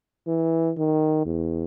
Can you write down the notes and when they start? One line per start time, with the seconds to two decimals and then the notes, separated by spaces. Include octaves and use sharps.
0.28 E3
0.77 D#3
1.26 E2